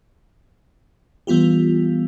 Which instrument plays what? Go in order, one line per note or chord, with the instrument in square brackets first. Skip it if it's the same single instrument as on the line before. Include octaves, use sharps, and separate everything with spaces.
[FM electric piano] E3 G3 B3 F4 G4